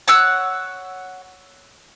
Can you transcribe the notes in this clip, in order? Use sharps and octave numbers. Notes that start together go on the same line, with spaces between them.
C#5 F#5 E6 F#6